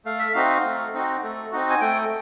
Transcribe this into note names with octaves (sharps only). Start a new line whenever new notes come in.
A3 F5
E5
C4 D#4 F#4 F5
A3
C4 D#4 F#4
A3
C4 D#4 F#4
G#5
A3 G5